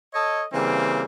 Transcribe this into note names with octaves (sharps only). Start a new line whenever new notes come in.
A4 C#5 D#5
C#3 E3 G3 A#3 C4